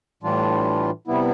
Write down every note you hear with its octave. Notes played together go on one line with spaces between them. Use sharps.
A2 E3 G3 D4 F4
C3 G3 B3 E4